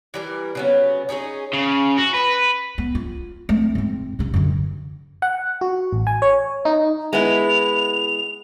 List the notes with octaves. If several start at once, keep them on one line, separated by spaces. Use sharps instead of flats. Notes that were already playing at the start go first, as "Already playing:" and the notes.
E3 G3 A#4
C#3 F#3 B3
C#4 D#4 E4 G#4
C#3
F#4
B4
B3
F4
A3 C4
G#2 C4
C3 D#4
F#2 D3
F#5
F#4
A1
G#5
C#5
D#4
G#3 B3 E4 F7